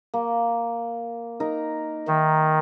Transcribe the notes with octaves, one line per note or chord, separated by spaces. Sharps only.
A#3
D#4 A#4
D#3 E5